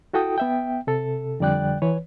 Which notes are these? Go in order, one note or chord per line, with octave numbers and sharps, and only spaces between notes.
E4 F#4 A4 G5 D#6
B3 E5 G5
C3 A4
F2 D3 G3 D5 G5 F#6
E3 B4 C#5